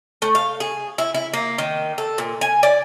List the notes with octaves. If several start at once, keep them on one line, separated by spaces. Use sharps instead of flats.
A3
F5
G#4
E4
E4
A#3
D#3
A4
A#2
G#5
D5